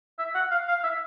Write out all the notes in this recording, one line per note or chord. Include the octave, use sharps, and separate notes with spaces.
E5
F#5
F5
F5
E5